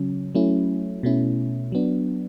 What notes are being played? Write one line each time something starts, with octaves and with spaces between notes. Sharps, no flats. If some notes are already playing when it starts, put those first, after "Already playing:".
Already playing: C#3 F#3 C#4
F#3 A3 C#4 E4
B2 A3 C#4 E4
F#3 B3 D4